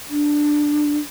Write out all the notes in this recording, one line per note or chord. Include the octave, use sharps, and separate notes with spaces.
D4